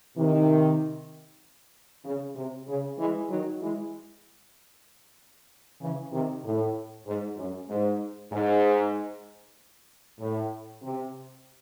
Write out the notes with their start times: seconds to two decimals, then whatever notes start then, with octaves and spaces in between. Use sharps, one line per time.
0.17 C3 D#3
2.04 C#3
2.36 C3
2.68 C#3
2.99 E3 G#3
3.30 D#3 F#3
3.61 E3 G#3
5.80 C#3 E3
6.12 C3 D#3
6.44 A2
7.06 G#2
7.37 F#2
7.69 G#2
8.32 G#2
10.19 A2
10.82 C3